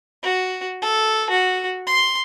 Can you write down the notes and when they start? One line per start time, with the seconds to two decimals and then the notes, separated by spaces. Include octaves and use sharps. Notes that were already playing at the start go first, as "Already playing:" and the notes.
0.23 F#4
0.82 A4
1.30 F#4
1.87 C6